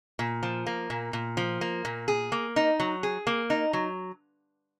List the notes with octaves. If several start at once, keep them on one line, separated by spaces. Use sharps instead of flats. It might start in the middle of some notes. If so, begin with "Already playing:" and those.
A#2
F3
A#3
A#2
A#2
F3
A#3
A#2
G#4
A#3
D#4
F#3
G#4
A#3
D#4
F#3